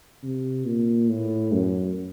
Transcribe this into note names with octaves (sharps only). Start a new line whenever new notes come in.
C3
A#2
A2
F#2